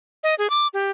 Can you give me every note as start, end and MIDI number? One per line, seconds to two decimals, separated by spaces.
0.24 0.35 75
0.39 0.50 68
0.50 0.67 86
0.74 0.91 67